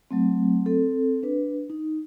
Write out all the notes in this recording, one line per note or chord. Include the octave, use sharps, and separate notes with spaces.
F#3 A3 C4
C4 A4
D4 B4
D#4